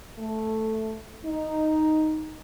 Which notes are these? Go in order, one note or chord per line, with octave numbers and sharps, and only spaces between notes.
A3
D#4